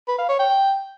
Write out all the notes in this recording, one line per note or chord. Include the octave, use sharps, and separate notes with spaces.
B4
F5
C#5
G5